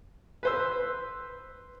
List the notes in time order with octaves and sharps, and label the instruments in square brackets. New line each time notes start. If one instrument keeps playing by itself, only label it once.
[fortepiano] B4 C5 E6